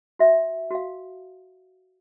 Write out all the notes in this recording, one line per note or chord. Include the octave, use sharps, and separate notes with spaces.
F#4 E5
F#4 F5